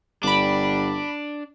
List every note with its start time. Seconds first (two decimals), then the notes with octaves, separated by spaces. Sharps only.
0.23 G1 G3 D4 B5 D6